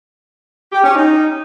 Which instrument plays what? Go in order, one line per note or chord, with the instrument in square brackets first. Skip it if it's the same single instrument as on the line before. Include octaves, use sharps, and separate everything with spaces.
[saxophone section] G4
C#4
D#4